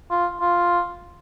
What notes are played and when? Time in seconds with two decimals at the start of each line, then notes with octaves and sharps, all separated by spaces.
0.11 F4
0.41 F4